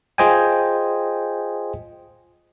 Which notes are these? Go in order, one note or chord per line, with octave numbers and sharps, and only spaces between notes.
F4 G#4 C5 D#5 G5 G#5